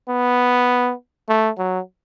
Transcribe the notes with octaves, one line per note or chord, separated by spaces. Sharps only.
B3
A3
F#3